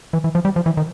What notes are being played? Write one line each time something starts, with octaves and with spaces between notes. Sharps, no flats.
E3
E3
F3
G3
F3
E3
D#3